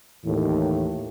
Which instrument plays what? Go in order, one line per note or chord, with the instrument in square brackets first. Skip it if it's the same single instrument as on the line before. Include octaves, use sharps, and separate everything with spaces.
[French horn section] D#2 A2 E3